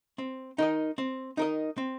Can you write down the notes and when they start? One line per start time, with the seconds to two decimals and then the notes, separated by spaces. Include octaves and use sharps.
0.18 C4
0.58 D#4 A#4 D#5
0.98 C4
1.37 D#4 A#4 D#5
1.78 C4